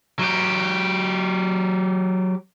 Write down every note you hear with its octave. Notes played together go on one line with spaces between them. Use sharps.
F#3 G4